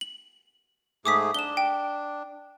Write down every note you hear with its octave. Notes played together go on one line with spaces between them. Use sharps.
F#7
G#2 A3 G#4 D6 D#6 B6
D4 E7 G7
G5